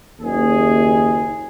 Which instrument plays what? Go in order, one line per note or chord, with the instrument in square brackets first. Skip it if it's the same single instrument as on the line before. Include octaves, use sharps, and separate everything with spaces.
[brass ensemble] F#1 D#2 G#4